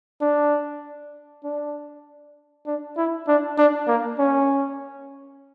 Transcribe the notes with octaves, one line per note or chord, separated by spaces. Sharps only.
D4
D4
D4
E4
D4
D4
A#3
C#4